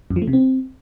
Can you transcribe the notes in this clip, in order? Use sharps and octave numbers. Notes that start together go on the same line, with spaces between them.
F#2
F3
A3
C3
C4